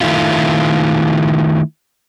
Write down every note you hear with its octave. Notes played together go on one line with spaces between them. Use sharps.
D#3 A3 E4 F4